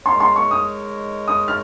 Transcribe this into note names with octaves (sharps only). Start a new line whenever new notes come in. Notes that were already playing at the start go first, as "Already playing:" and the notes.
G#3 D#4 A#4 C#5 C6
C6
C#6
D#6
D#6
F6